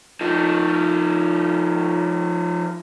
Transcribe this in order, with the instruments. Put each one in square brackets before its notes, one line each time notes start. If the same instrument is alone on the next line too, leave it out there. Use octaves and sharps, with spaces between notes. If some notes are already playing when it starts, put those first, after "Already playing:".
[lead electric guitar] F3 D#4